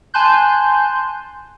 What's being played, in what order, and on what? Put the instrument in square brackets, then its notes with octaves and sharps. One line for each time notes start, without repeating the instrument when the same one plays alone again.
[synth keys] G#5 A5 C6 F#6 G6